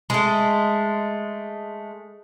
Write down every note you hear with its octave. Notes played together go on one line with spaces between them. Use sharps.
G#3 A3